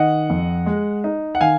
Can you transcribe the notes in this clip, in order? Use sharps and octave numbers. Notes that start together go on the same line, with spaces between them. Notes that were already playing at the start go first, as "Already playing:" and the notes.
Already playing: D#3 D#5 F#5
F2
G#3
D#4
F#5
D#3 F5 G#5